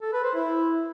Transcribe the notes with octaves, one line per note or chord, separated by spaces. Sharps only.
A4
B4
C5
E4